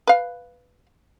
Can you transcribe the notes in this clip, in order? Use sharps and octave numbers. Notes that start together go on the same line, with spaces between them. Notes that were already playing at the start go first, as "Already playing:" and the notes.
B4 F5